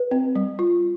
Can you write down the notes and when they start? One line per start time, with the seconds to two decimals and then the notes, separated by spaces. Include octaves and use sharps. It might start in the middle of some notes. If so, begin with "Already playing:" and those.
Already playing: B4
0.11 C4
0.36 G3
0.59 F4